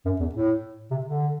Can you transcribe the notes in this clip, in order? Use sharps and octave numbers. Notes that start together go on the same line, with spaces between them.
F#2
E2
A2
C3
D3